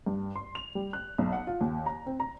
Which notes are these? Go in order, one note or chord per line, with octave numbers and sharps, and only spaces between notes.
G2
C6
F7
G3
F#6
B1
F#5
F4
D#2
A#5
C4
A#5